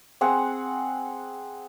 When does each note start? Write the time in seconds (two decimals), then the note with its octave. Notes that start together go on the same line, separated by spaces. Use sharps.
0.21 C4 G#4 F#5